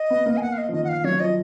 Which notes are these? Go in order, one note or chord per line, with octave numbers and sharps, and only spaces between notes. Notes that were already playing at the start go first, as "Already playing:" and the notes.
Already playing: D#5
B3
A#3
G#5
F#5
F5
D#5
F3
D#3 D#5
F#5
F5
F#3 C#5
F3 D#5